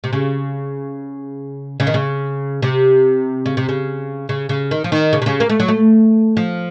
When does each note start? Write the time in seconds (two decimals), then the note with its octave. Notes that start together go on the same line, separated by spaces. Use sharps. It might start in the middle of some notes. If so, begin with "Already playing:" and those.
0.04 C3
0.13 C#3
1.80 C#3
1.87 D#3
1.94 C#3
2.62 C3
3.46 C#3
3.57 C3
3.69 C#3
4.29 C#3
4.49 C#3
4.71 D#3
4.84 F3
4.92 D#3
5.13 C#3
5.22 C3
5.26 C#3
5.40 A#3
5.49 A3
5.60 F#3
5.68 A3
6.37 F3